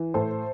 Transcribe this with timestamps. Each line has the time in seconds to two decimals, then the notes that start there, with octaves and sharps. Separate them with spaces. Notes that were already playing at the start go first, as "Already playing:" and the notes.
Already playing: E3
0.14 A2 A4 C5